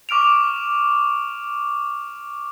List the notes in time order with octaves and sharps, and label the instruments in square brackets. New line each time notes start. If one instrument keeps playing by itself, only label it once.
[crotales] C#6 D6 F6 D7 F7